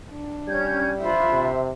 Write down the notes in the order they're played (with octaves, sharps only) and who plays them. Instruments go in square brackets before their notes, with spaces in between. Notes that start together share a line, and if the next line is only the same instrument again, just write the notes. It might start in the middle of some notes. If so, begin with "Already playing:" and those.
[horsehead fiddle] D4
[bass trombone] G3 [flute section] C#4 G6 G#6
[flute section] D4 F4 B5 [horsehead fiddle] C5 E5
[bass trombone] C3